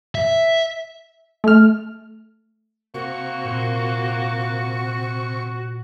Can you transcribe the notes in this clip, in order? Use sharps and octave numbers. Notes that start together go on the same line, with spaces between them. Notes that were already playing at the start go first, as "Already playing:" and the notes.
E5
A3 F6
C3 A#3 F#4 C#6
A#2 C4